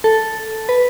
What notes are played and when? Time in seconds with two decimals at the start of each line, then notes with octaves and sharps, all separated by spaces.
0.04 A4
0.69 B4